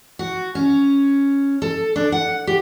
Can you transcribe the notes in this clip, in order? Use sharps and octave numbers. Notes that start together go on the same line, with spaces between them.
F#4
C#4
A4
D4
F#5
G4